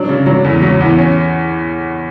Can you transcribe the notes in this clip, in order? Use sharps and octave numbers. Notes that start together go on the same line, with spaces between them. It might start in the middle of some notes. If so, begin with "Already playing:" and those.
Already playing: F#3 D4
C#3
F#3
E2
F#3
E2
C#4